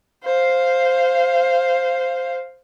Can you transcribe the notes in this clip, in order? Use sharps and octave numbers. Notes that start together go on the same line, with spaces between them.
C5 F5